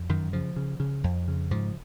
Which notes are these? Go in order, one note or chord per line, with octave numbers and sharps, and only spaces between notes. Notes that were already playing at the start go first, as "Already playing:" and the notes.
Already playing: F2
F#2 D#3
C#3 F3
C#3
C#3
F2
C#3
G#2 F3